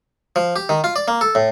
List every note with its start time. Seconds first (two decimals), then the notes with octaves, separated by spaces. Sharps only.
0.36 F3
0.56 G4
0.69 D#3
0.84 F4
0.96 D5
1.08 A#3
1.21 A4
1.35 A2